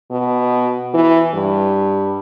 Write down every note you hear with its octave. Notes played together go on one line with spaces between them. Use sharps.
B2
E3
G2